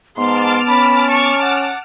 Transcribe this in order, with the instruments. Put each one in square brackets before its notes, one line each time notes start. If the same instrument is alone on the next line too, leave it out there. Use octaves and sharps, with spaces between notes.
[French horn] G#2 [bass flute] B3 [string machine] A5 D6 F6 [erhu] C6
[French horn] C#4 [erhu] B5
[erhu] C#6
F#5